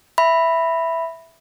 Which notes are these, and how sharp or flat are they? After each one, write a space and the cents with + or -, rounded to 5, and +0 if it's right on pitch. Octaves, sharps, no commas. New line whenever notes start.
E5 +0 B5 +0